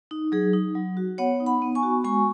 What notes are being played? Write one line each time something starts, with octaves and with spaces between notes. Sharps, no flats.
D#4
F#3 G#4
D#4
F#3
F#4
B3 C#5 F#5
D#4
F#5 B5
B3
G#5 C#6
F#4
G#3 G#5 C#6